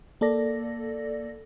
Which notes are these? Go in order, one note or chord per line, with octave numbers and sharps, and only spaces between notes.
A#3 A4 D5 A#6